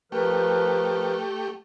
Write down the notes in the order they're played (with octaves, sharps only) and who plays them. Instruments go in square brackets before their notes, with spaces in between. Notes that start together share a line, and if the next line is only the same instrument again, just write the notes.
[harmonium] F3 A#4 B4 [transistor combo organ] A3 G4